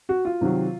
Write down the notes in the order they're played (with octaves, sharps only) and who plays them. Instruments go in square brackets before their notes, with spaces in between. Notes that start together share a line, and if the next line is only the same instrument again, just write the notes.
[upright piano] F#4
F4
C3 D#3 F#3